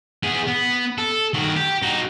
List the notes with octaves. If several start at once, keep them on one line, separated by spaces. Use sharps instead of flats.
B3 G#4
B3
A4
D#3 F#4
G4
D#4 F#4